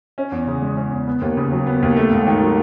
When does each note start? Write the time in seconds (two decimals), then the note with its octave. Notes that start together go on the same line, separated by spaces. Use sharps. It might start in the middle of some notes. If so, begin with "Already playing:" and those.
0.18 C#4
0.32 E2
0.47 C#3
0.62 G#3
0.77 C#4
0.92 E2
1.07 B3
1.21 D#2
1.37 C#3
1.52 F#3
1.67 B3
1.82 D#2
1.97 A3
2.12 G#2
2.27 D#3
2.41 F#3